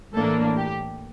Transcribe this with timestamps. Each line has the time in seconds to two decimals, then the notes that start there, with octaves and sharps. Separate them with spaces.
0.13 A2 E3 A#3 D4 A4
0.57 G4